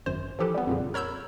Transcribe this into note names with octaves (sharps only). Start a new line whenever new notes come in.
G#1 F#2 C5
E3 F3 G4 A4 B4
G3 B3
F2 A#2 C#3
A#4 C#5 B5 E6 G6